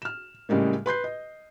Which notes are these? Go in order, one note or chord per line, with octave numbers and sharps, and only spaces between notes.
F6 E7
A2 C#3 G3 G#3 A#3
B4 C6 G6 C7
D#5